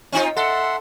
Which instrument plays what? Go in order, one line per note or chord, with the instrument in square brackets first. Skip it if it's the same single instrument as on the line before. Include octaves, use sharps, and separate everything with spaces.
[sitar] C4 D#4 F4
[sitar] A4 [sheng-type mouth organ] E5 F#5 C6